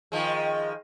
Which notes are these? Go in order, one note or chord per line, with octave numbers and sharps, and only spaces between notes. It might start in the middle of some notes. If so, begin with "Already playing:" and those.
D#3 F3 G#3